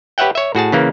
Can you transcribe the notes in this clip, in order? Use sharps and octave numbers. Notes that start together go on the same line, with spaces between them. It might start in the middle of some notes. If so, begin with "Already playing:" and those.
G4 B4 C#5 E5 F#5 G5
C#5 E5
A2 F#4 G#4 A5
C#3 E3 A#3